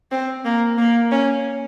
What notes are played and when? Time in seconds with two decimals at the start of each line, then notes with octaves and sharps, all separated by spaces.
0.12 C4
0.45 A#3
0.78 A#3
1.12 C#4